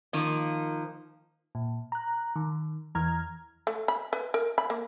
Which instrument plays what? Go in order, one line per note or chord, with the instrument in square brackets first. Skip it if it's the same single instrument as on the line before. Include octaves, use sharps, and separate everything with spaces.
[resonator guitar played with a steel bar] D#3 F3 A#3 D#4
[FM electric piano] A#2
A#5 F#6
D#3
E2 E3 A#5 F6 G#6
[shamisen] A3
B5
B4
A#4
B5
A#3